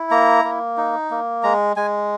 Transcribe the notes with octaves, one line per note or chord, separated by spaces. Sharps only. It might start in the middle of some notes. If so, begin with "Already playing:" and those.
Already playing: E4
A#3 A#5
A#3
D#4
A#3
G#3 A#5
G#3 G#5